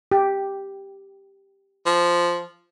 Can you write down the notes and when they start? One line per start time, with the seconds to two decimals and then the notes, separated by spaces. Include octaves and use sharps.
0.12 G4
1.86 F3